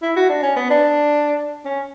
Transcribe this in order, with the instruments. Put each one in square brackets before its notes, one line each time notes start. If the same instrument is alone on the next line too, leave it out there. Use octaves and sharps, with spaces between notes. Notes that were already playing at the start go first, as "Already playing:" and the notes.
[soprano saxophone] E4
F#4
D4
C#4
B3
D4
C#4